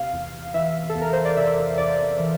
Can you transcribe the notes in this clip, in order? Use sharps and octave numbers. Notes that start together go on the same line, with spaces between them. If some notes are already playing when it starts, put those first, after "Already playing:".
Already playing: C3 F5
E2
E3 E5
A4
E2
A#4
C5
D5
C3 E5
E2 D5
E3